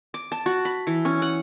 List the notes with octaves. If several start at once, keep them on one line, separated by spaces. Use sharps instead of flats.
D6
A5
F#4
B5
E3
C#4
F#5